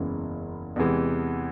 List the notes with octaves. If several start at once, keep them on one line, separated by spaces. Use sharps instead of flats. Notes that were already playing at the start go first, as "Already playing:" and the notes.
Already playing: F#1 E2 C#3 E3 G#3
E2 C3 E3 G#3